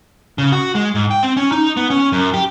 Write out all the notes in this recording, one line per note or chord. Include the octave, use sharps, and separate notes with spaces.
C#3
F#4
G#3
G#2
G5
C4
C#4
D#4
B3
C#4
F#2
G4